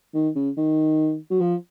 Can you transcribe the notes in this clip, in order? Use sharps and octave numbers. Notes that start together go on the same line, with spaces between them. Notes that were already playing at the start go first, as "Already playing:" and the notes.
D#3
C#3
D#3
F#3
F3